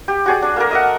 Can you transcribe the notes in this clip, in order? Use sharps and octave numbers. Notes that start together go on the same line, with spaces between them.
G4
F#4 G#4 D5
D4
A#3 A4 A#4
D#5 E5 F#5